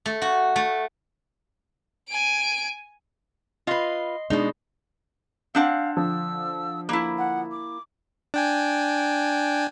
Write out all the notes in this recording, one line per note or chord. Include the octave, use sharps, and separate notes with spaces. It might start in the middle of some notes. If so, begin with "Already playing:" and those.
A3
F#4
A3
G#5 D7
F4 B4 D#5 C6 C7
B2 G#3 D4 D#4
C4 D4 F5 F#5
D3 F3 E6
A#3 E4 B5
F#5
D6
D4 G5 G#5